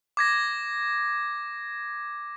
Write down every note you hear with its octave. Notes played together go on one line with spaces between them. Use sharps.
D6 G#6 A#6